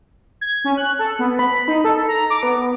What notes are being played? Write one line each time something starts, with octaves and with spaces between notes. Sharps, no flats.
G#6
C#4
F#6
A4
B3
B5
D#4
A4
A#5
D6
B3